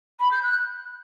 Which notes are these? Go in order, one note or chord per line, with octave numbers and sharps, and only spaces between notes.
B5
G6
F#6